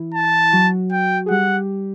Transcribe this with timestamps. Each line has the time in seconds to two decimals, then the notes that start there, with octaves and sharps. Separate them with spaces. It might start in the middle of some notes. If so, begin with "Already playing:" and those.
Already playing: E3 E4
0.14 A5
0.53 F#3 F#4
0.92 G5
1.26 G#4
1.30 G3 G4 F#5